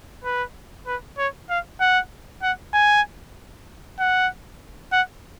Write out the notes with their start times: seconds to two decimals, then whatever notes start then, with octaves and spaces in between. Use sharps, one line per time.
0.24 B4
0.87 B4
1.18 C#5
1.50 F5
1.80 F#5
2.43 F#5
2.74 G#5
4.00 F#5
4.92 F#5